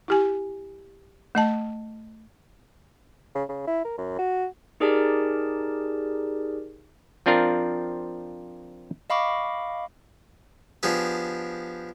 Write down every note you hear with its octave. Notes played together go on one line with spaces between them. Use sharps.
E4 G4 G#5
A3 D#5 A5
C#3
C#3
E4
A#4
F#2
F#4
D#4 G4 G#4 A#4 D5 A5
F3 C4 D4 F4 A#4
D#5 F5 B5 C#6 D6
F3 B3 D4 G4 G#4